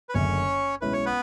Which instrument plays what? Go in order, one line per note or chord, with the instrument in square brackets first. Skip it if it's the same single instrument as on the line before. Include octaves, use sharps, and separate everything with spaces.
[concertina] B4
[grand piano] F#1 F#2 D3 A3 [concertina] C#4 C#5
[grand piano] B1 B2 G#3 C#4 E4 [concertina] B4
[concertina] C#5
B3 B4